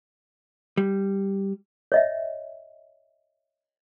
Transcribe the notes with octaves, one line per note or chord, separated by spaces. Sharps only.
G3
C#5 D#5 E5